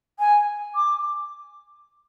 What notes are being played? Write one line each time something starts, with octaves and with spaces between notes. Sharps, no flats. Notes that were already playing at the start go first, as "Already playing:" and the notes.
G#5
D6